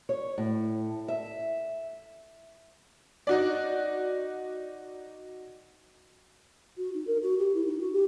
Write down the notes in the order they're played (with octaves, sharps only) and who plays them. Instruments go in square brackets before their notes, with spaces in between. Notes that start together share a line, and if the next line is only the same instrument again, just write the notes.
[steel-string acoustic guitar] C#5
A2
E5
[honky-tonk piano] D#4 F#4 D5
[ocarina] F#4
D#4
A#4
F#4
G4
E4
D#4
F#4
G4